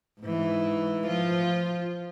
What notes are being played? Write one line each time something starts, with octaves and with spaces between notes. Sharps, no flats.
G#2 E3
F3 F4